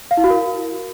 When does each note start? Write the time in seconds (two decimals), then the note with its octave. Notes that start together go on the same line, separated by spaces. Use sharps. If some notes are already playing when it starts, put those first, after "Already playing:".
0.11 F5
0.17 E4
0.24 F#4
0.30 A#4